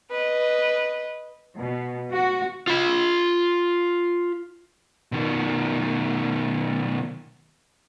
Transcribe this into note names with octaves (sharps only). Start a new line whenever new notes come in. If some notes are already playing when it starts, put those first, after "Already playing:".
B4 D#5
B2
F#4
F4 B5
B2 D#3